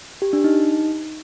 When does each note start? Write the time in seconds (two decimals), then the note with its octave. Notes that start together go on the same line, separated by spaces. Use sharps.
0.22 G4
0.33 D4
0.44 D#4